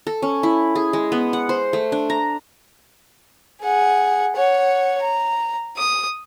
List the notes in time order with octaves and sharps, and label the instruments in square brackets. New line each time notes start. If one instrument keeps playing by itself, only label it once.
[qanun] A4
C#4
E4
G#4
G#3
B3
F#5
C5
A3
D4
A#5
[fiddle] G#4 F#5
C#5 F#5
A#5
D#6